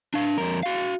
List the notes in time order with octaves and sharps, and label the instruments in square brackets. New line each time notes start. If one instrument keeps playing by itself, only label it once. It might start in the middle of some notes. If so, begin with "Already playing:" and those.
[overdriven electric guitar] D4 F5
F2 A#4
F#4 F5